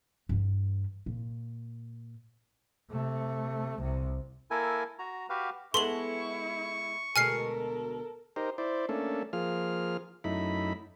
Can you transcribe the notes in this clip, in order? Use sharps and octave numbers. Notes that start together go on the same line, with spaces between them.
G2 E3
A#2
C3 A3
C2 C3
A#3 E4 A4 A#4 G#5
F#4 A#5
F#4 G4 B4 F5
G#3 B3 E4 A4 C6 C#6 F#7
D2 B2 G#3 A4 A#4 G#5 F6 C7
D#4 G4 A#4 C5
E4 C5 D5
A3 A#3 C#4 D4 A4
F3 A#3 F4 G#4 F6
F#2 A3 D#4 E4 B5